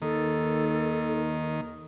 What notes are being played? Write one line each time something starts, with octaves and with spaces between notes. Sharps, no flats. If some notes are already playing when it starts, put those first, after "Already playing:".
D#2 D#3 A4